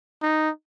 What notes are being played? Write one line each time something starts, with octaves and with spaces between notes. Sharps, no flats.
D#4